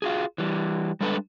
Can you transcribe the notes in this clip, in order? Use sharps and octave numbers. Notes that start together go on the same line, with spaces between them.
F4 F#4 G#4
E3 G3
G3 G#3 D4 A4 B4